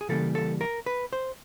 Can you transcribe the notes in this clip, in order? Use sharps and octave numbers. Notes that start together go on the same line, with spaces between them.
G#4
C#3 E3 G3 A#3 A4
A4
A#4
B4
C5